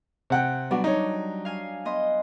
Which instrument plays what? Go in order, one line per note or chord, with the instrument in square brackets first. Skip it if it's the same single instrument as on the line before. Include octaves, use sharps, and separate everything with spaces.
[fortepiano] C3 F#5 G5
[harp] F#3 G3 D4 [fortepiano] B3 F#4
[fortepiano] D#4 C#5
[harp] F5 G#5
B3 D#5 C6